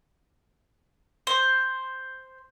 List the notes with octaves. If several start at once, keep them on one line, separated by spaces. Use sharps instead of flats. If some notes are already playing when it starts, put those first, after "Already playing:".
C5